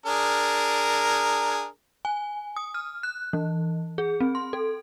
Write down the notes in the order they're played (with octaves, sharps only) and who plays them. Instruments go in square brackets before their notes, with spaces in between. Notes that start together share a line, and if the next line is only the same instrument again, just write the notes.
[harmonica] D4 G#4 A#4
[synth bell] G#5
D#6
F6
F#6
E3
G#4
C4
C6
A4